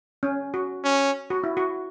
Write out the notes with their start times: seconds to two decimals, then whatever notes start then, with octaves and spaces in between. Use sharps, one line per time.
0.23 C#4
0.54 F#4
0.84 C#4
1.30 F#4
1.44 E4
1.57 F#4